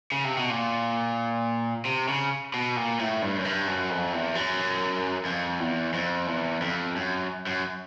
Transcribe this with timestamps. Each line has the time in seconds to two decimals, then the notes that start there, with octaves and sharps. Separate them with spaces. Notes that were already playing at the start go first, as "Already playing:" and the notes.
0.12 C#3
0.24 C3
0.37 B2
0.50 A#2
1.85 C3
2.08 C#3
2.54 B2
2.76 A#2
2.99 A2
3.22 G2
3.37 F#2
3.44 G2
3.67 F#2
3.90 F2
4.13 E2
4.35 F#2
5.25 F2
5.59 E2
5.94 F2
6.27 E2
6.62 F2
6.96 F#2
7.47 F#2